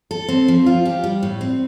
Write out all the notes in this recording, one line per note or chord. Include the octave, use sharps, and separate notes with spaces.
A4
C4
F3
F4
G4
G3
A2
C4